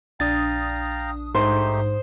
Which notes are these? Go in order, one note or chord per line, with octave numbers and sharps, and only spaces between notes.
A#1 D4 F5 G5 A#5 D#6 A6
G#2 A3 D#4 G4 C5